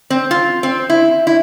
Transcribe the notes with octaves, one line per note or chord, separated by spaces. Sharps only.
C4
F4
C4
E4
E4